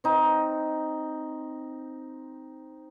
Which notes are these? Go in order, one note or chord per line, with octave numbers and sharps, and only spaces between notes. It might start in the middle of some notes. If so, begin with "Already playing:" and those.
C4 D#4